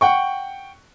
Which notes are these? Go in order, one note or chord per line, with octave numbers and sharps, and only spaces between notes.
F#5 G5 C#6